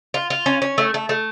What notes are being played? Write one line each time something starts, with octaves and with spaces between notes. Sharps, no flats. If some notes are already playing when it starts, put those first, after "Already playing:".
F4
F4
C#4
C#4
A3
A3
A3